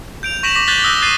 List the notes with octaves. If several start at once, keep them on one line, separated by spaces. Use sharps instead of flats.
G6 D7 F7
C#6 A#6 B6 D7 E7 F#7
C#6 D6 A#6 B6
F#6 G6 A6 B6 F#7 G7
D#6 E6 F#6 A#6 G7
F#6 A6 C7 D#7